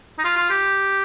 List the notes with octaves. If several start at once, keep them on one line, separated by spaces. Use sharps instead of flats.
D#4
F4
F4
G4